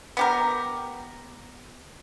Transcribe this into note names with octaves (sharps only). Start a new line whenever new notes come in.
B3 G4 A#4